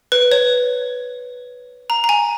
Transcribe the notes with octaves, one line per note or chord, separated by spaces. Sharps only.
B4
C#5
A#5
A#5
G#5